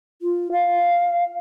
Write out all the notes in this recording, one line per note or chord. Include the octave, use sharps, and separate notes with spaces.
F4
F5